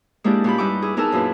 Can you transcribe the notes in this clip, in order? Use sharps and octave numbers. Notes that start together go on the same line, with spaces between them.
G#3 A#3 D4 E4 G4 D5
A#2 C#4 G4 B5
G2 G3 D#4 E4 F#5 D6
E4 G#4
B3 D#4 G#4 A#4 A5 E6
F#2 A#2 E4 B4